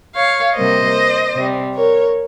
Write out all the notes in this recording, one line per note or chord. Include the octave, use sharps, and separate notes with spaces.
C#5 F5
C3 G3 A#3 C5 D#5
C3 G3 C4
A#4 C#5